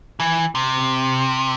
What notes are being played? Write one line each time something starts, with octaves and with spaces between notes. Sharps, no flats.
E3
C3